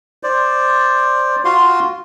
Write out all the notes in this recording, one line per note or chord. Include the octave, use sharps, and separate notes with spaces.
C5 D5
F4 F#4 F5 C6